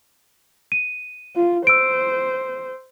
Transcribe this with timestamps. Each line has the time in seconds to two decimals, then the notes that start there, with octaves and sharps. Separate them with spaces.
0.72 D#7
1.36 F4
1.67 C5 E6 D7